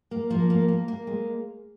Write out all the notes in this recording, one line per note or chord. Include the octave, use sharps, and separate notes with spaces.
A#3
F3 A#3
A#3
A#3
A#3
G#3